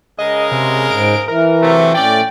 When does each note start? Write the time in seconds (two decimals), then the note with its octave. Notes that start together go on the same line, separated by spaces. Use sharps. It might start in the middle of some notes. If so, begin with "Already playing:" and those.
0.19 C#3 G#3 A#4 D#5
0.52 C3
0.91 G#2 D7
1.28 E3 A#4
1.61 C3 F#3 A3
1.94 A2 C#4 D5 G5